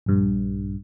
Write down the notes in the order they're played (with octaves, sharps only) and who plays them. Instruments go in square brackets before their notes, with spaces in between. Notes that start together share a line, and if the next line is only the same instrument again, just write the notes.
[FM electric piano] A#1 G2